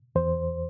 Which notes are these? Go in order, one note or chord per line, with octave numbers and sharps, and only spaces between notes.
E2 C5